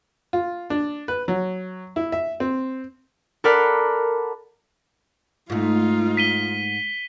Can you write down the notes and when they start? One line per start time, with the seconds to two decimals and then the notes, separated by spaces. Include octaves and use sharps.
0.33 F4
0.70 D4
1.08 B4
1.28 F#3
1.96 E4
2.12 E5
2.40 C4
3.44 A4 A#4 D5 F#5 B5 F6
5.50 G#2 A3 D#4 F4
6.17 B6 D#7 G7